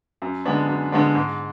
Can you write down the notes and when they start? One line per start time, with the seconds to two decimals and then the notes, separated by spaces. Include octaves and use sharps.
0.22 F#2
0.45 D3 G#3 B3 D4
0.68 F#2
0.92 D3 G#3 B3 D4
1.15 G#2